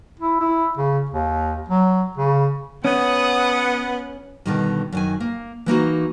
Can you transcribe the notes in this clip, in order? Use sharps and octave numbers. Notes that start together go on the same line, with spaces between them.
E4
E4
C#3
D#2
F#3
C#3
B3 C#4 F#5 D#6
B2 D3 D#3 G3
F#2 D#3 G#5
A#3
E3 A#3 D#4 F#4